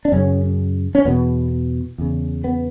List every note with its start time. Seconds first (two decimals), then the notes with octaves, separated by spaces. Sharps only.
0.05 D4
0.12 F#2 C#3 C#4
0.95 C#4
1.05 E2 B2 B3
1.98 E2 C#3
2.44 B3